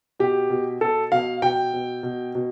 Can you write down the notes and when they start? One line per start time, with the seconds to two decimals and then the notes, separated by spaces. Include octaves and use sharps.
0.20 B2 G4
0.50 B2
0.81 B2 A4
1.12 B2 F5
1.42 B2 G5
1.74 B2
2.03 B2
2.35 B2